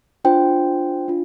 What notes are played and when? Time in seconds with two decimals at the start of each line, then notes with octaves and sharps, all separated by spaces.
0.25 D4 F4 C5 G5
1.08 D4 F4